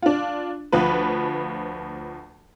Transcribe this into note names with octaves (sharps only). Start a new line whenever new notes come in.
D4 F4
D2 F3 B4